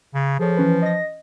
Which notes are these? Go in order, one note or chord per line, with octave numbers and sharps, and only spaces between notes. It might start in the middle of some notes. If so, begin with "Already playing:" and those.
C#3
F3 G#4 A4 C#5
E3 C#4 B4
D#5 A#6